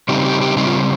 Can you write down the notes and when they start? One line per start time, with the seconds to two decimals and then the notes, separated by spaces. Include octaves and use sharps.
0.08 C#3 G3 C4 D#4 G4
0.25 G4
0.41 G4
0.57 C#3 G3 C4 D#4 G4
0.66 F4